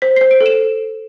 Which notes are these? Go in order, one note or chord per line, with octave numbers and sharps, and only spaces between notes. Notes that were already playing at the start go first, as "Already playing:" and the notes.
C5 B6
C5 C7
D7
A4
E7